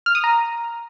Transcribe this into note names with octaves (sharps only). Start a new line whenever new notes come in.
F6
D#6
A#5